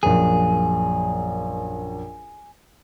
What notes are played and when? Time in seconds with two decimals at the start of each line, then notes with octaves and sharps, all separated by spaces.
0.03 A#1 F#2 G#4